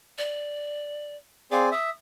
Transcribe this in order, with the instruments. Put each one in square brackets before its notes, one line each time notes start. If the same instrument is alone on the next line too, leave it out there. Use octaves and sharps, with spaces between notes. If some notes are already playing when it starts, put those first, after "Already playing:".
[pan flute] D5
[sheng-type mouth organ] C4 G#4 D5 [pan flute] F5
[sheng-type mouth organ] E5 [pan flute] D#6